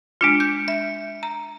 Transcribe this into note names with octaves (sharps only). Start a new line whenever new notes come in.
G#3 D4 F4 C#7 D7
G6
E5
A#5